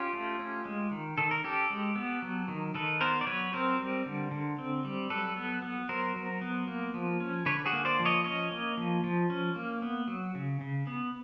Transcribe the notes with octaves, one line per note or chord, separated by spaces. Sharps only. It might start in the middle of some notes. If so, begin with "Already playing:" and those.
Already playing: C#4 F4 G4
A3
C#4
G#3
D#3
D#3 A4
A#4
C#4 G4 A4
G#3
B3
F#3
D#3
D#3 A4 B4
B3 A#4 C5
D5
F#3 B4 C#5
C4 A#4 C5
G3
D3
D3
C4
G3
F#3 A4 B4
B3
B3
F#3 A#4 C5
F#3
B3
A#3
F3
C#4
D3 B4 C#5
F#4 G#4
A#3
C5 D5
F3
C#5 D#5
C#4 C#5 D#5
A#3
F3
F3
C#4
A#3
B3
F#3
C#3
C#3
B3